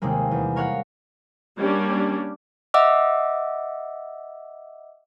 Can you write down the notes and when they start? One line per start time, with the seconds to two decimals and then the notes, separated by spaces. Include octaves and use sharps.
0.02 D#2 C3 G3 G#3 A#3
0.31 E2
0.56 A#4 C#5 F5 F#5
1.57 G3 A#3 C#4 D4
2.74 D#5 E5 F#5 D6 E6